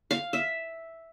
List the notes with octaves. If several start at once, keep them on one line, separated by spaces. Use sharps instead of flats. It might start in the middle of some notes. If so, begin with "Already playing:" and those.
F5
E5